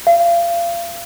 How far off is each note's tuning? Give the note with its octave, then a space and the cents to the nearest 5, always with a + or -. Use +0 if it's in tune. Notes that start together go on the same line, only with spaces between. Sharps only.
F5 -30